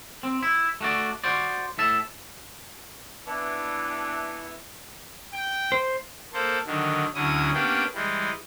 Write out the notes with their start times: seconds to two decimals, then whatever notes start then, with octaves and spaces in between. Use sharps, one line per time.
0.23 C4
0.43 E4
0.81 A3 F#4 D5
1.24 F#4 C5 D5
1.78 A2 E5 A5
3.27 E3 B3 D4
5.33 G5
5.72 C5
6.33 A#3 A4 C5
6.66 D3 D#3 F#3
7.15 D2 D3 F#3 C#4 E4 D#6
7.54 A#3 B3 C#4 D4 G4 G5
7.94 E3 G3 G#3